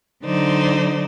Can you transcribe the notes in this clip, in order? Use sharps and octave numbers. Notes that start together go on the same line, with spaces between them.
D3 F#3 D#4 C5 D5